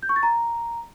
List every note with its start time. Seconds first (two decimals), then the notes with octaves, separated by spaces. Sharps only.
0.03 G6
0.09 C#6
0.16 A6
0.23 A#5